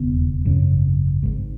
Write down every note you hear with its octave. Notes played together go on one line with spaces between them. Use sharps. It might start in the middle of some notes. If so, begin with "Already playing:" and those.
Already playing: E1 D#2 C#3 B3
G#1 F#2 C#3
G#1 G#2